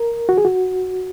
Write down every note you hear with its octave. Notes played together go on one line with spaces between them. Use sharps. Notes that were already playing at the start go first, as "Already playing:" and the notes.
Already playing: A#4
F#4
G#4
F#4